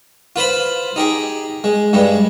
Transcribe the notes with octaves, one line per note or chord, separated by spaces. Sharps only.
F4 B4 C5 B5
D#4 G4 G#4
G#3
G2 G3 G#3